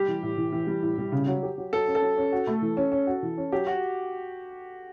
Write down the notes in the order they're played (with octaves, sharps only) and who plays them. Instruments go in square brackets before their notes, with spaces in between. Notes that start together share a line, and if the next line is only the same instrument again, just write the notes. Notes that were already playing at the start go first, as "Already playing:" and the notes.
Already playing: [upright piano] G3 [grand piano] G4
[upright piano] E3
A2
E3
E3
G3
A2
G3
C#3
F#3
G4
F#3
[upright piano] F#3 [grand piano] A4
[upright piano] C#4
[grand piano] A4
[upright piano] F#3
C#4
F#4
A3
E3
C#4
C#4
F#4
E3
C#4
[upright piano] F#3 [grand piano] G4
[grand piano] F#4